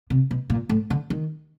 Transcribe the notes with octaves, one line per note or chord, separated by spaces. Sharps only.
C3
B2
A#2
A2
D3
D#3